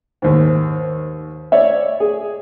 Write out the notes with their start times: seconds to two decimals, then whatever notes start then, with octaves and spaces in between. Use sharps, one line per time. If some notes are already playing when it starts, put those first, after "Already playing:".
0.22 D#2 G#2
1.52 C#5 D5 E5
2.00 G#4